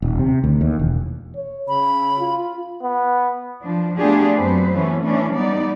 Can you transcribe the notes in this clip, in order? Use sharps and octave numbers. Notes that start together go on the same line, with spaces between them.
D#1
C3
D2
D#2
E1
C#5
C#3 B5
F4
B3
F3 D4
A3 B3 D4 F4 G4 G#4
F#2 F#3 C4 B4 C5
E3 A3 B3 C#4
E3 C#4 D4
G3 B3 D#4 D5